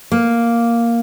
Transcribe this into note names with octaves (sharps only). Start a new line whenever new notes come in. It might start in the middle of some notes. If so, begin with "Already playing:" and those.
A#3